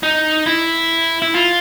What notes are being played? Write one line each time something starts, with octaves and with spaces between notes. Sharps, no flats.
D#4
E4
E4
F4